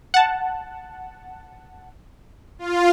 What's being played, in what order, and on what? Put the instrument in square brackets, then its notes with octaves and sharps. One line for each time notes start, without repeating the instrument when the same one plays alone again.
[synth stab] F#5 A5
[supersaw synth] F4